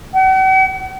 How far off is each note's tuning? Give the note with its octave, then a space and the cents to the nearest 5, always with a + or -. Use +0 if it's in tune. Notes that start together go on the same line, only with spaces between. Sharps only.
F#5 +45